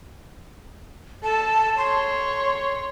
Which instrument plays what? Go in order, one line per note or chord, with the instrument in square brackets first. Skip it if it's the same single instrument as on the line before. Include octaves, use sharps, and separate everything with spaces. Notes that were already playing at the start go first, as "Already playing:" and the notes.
[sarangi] A4 [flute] A5
[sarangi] C#5 [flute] C6